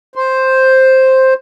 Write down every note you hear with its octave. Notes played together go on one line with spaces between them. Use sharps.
C5